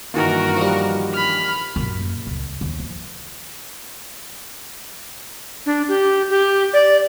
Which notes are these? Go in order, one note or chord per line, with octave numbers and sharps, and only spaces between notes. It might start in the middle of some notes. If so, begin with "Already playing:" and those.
G2 D#3 E3 A#3 F#4 A#4
F3 G3
B5 F6
F#2 A#2
C#2
D#2
F3
D4
G4
G4
D5